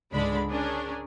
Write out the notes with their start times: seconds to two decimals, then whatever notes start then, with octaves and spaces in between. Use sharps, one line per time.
0.12 C#2 G#2 D3 G#3 D4 B5
0.50 C#4 D4 G#4 A#4